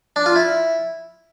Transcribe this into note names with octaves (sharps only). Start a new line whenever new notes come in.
D4
F4
E4